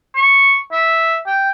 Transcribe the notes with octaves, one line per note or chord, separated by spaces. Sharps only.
C#6
E5
G5